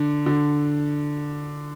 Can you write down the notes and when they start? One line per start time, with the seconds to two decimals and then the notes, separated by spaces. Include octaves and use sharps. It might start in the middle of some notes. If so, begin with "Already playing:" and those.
Already playing: D3
0.26 D3